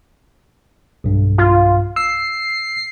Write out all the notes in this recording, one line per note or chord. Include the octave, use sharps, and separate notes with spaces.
B1 G2
F4
E6 C7